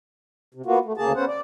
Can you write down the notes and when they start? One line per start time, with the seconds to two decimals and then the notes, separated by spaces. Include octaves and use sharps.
0.55 C3
0.66 A#3 B3 F4 F#4
0.85 A3
0.98 D2 C#3 A#3 G#4 A5
1.16 B3 C#4 C5 F#5
1.28 D5